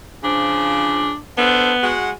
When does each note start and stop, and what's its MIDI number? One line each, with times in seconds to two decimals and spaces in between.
0.24 1.11 49
0.24 1.11 53
0.24 1.18 62
1.38 1.92 59
1.38 1.73 62
1.38 1.73 69
1.38 1.73 72
1.83 2.11 56
1.83 2.11 66
1.83 2.11 78